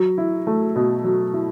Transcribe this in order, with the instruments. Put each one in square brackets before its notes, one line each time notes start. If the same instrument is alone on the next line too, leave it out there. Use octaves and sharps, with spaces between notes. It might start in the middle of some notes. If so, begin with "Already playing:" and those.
Already playing: [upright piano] F#3
E4
A3
B2
F#3
E4